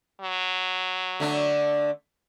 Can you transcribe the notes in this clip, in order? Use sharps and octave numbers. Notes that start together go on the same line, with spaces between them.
F#3
D3 A3 D4